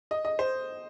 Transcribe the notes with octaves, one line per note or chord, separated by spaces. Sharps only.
D#5
D#5
C5